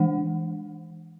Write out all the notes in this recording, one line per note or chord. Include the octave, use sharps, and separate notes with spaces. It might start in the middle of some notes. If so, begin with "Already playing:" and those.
Already playing: E3 G#3 D4 F#5